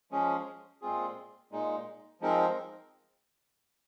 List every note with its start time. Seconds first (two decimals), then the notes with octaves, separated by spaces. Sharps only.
0.11 F3 G#3 C#4 G#4
0.82 A#2 G#3 C4 F4 G#4
1.52 A#2 G#3 D#4
2.21 F3 G#3 C4 D#4 A#4